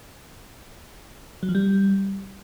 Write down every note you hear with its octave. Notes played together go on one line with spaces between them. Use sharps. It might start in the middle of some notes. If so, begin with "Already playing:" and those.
F#3
F3
G3